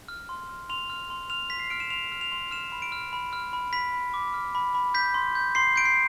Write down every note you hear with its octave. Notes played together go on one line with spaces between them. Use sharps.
F6
C6
F6
C6 F7
F6
C6
F6 F7
C6 B6
C7
F6 D7
E7
C6 F7
F6
F7
C6
F6 E7
B5
D7
F6
B5
F6
B5
B5 B6
B5
D6
F6
B5
B5
G6 B6
C6
G6
C6 C7
G6 D7
C7